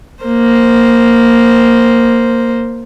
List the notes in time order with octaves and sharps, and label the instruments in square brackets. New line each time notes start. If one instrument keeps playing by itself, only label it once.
[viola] A#3 C5